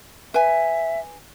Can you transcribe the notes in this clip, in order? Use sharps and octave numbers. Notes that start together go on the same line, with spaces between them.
B4 E5 G#5